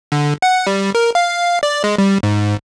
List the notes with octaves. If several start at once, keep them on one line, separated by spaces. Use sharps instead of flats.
D3
F#5
G3
A#4
F5
D5
G#3
G3
G#2